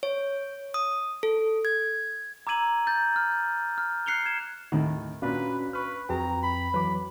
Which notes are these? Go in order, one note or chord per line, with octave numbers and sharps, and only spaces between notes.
C#5
D#6
A4
G#6
A#5 D6 E6 G#6 D#7 F#7
G6 A6
F6
F6
F#6 C7 C#7 F7 G7
G#6 E7
D#2 A2 D#3
A#2 C#4 D4 F#4 B4 F5
B4 C#6 F6
F2 F#3 G#4 B4 G5 A#5
B5
E3 F#3 B4 D6